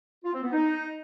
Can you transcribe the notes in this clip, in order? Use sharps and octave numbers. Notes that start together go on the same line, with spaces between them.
F4
C4
B3
D#4